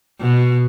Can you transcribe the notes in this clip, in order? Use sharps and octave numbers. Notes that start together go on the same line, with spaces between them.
B2